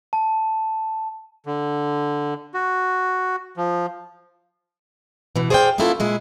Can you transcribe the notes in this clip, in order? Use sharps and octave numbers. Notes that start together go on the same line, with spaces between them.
A5
D3
F#4
F3
B2 E3
G#4 C5 D5 D#5 F5 G5
A#3 B3 C#4 E4 F4 A4
A#2 G#3 E4